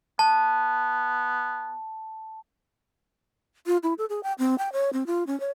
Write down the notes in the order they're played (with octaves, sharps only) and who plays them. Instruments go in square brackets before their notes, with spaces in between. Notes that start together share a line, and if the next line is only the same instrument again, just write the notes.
[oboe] B3 [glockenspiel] A5
[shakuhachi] F4
E4
A4
G#4
G5
C4
G5
C#5
C4
F4
C#4
C#5